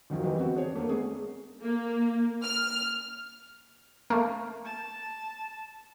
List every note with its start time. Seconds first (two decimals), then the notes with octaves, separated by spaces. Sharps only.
0.10 D2 D#3 F3 F#3
0.24 D#3 E3 G3
0.38 B3 C4 F#4
0.56 D4 G#4 C#5
0.76 A3 A#3
0.89 G#3 A3 B3 G#4
1.62 A#3
2.42 F6
4.10 A3 A#3
4.65 A5